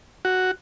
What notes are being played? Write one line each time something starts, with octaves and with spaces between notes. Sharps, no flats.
F#4